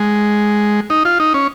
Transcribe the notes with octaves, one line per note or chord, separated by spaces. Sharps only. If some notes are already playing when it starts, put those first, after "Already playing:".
Already playing: G#3
D#4
F4
D#4
C#4